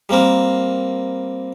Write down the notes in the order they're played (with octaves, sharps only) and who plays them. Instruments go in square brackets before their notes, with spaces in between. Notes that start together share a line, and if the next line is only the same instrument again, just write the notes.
[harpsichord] G3 A#3 C4 A#4